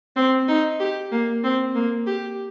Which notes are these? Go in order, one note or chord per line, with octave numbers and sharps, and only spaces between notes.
C4
D#4
G4
A#3
C4
A#3
G4